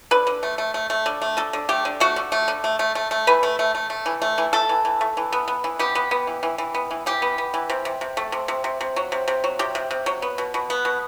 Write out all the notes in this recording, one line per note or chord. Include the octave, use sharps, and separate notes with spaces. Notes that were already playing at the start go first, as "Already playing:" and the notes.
D3 B4
D3
A3
A3
A3
A3
D3
A3
D3 A4
D3
A3 G4
D3
A3 F#4
D3
A3
D3
A3
A3
A3
A3
E3 B4
A3
A3
A3
A3
E3
A3
E3
A3 A4
E3
E3
A3
E3
B3
B3
E3
B3 G4
B3
B3
E3
E3
E3
B3
E3
E3 G4
B3
B3
E3
C3
C3
C3
A3
C3
C3
C3
C3
F#3
C3
C3
F#3
C3 G4
C3
C3
F#3
B3
B2
B2
B3
B2